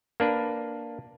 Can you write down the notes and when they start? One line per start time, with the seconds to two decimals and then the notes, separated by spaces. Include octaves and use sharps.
0.20 A#3 D4 B4